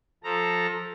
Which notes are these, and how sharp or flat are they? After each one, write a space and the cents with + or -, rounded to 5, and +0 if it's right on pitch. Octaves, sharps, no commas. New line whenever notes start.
F3 +15 A4 +0 A#5 -5